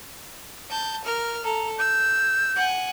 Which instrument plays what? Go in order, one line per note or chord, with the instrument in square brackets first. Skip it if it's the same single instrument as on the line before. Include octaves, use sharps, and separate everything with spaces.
[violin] A5 G6
A#4 F6
[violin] A4 [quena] A#5
[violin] E6 [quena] G6
[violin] F#5 G#5